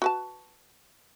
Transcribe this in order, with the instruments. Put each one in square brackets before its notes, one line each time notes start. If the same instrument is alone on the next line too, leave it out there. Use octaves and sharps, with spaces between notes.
[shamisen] F#4 B4 A5